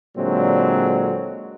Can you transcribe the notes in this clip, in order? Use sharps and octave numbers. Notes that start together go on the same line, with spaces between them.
A#2 D3 F#3 G#3 C4